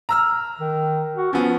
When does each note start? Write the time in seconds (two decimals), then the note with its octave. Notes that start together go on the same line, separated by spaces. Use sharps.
0.09 A#5 E6 F6
0.60 D#3
1.16 F#4
1.33 F3 B3 C#4